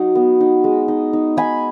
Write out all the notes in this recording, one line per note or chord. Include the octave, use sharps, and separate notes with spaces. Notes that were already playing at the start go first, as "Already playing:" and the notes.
Already playing: F#3 D#4
B3
D#4
G#3
D#4
D#4
D#4 G#5 B5